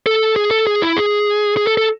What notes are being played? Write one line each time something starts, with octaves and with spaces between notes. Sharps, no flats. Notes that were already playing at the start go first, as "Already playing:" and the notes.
A4
G#4
A4
G#4
E4
G#4
G#4
A4
A4